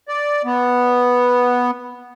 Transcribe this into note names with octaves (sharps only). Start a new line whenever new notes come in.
D5
B3